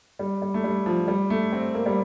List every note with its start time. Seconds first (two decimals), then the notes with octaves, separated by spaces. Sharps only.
0.19 G3
0.42 G3
0.54 A3
0.64 G3
0.86 F3
1.08 G3
1.30 A3
1.53 C4
1.75 A#3
1.86 G3